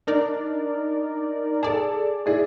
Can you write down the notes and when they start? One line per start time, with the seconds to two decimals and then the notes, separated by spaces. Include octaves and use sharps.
0.07 D4 D#4 A#4 D5
1.63 G#4 A4 D5 A5
2.26 E4 G#4 D5